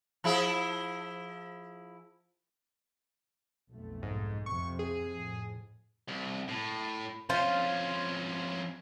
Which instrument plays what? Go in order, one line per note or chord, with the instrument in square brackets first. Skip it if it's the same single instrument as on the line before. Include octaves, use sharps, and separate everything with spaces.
[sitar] F3 E4 G#4
[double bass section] B1 F2 A3
[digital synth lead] G#2
[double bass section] F2 C3 [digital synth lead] C#6
[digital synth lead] G#4
[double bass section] F2 A2
[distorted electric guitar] C2
A2
[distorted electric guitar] F2 C#4 [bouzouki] F4 C5